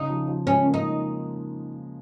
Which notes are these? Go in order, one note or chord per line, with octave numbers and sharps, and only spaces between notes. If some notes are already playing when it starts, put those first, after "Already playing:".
Already playing: C#3 D#4
F3
F3
G#3 C#4
A#3
D#4